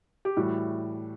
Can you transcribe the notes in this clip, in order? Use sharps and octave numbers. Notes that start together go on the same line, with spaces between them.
G4
A2 E3 G3 F#4